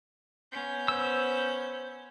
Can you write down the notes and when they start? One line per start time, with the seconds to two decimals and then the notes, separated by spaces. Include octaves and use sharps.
0.52 B3 C#4 G6
0.88 C5 E6